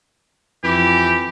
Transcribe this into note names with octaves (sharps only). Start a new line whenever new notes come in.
F2 E3 G4